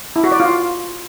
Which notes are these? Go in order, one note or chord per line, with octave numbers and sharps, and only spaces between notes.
E4
F#4
D5
F4